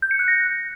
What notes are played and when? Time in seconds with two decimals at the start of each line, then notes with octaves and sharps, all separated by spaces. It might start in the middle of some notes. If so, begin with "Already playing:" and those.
0.02 G6
0.11 C#7
0.19 F#6
0.28 A#6